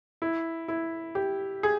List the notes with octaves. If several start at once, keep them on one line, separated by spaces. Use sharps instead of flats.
E4
E4
G4
G#4